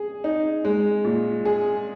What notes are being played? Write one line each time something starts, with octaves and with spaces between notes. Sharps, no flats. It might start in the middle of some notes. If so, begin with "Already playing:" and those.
Already playing: G#4
D#4
G#3
A#2
G#4